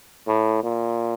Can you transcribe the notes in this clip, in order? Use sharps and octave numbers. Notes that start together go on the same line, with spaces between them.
A2
A#2